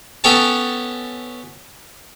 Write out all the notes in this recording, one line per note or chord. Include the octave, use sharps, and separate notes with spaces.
B3 C#4 A4 C#5 G5 A5